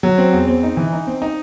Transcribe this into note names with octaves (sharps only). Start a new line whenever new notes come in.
F#3
C4
E2
C4
D#4
E3
D#4
C4
D#4